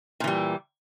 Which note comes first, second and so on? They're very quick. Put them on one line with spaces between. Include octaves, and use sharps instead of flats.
A#2 E3 G3